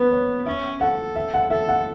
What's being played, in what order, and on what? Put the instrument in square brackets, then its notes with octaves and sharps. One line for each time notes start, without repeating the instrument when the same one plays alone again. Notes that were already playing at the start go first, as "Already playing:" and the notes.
Already playing: [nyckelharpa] B3 [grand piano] B4
[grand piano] C#5
[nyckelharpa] C#4 [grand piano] E5
[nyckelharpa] A4 [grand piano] F#5
[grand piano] E5
F#5
[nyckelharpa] A4 [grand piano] E5
[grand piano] F#5